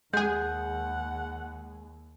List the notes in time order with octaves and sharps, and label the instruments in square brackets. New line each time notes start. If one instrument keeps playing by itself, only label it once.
[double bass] D#2 [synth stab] G#3 G#4 [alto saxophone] F#5 [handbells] G6